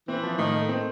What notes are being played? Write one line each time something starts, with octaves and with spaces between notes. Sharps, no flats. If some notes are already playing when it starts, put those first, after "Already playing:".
E3 C4
F3
A2 D#3
A3
C4